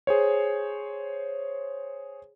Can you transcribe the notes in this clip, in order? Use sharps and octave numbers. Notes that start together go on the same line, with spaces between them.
G#4 C5 C#5